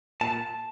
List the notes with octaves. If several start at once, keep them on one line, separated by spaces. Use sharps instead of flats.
A#2 A5